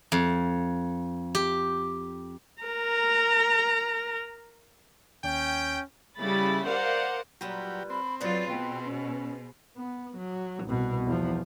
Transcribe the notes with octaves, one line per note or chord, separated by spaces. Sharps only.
F2
G4
A#4 A#5
D#2 C#4 G5
C#3 G3 E4 B5 A6
A#4 C5 D5 F5 F#5
A#2 F#3 G3 G4 B4
C4 B5
F#3 F4 G#4 B4 C5 D5
B2 G5
C#4
B3
F#3
C2 B2
E2 F3